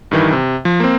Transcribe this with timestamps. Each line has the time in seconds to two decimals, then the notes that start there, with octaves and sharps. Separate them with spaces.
0.11 G2 D#3 E3
0.33 C3
0.65 F3
0.80 A#3 C4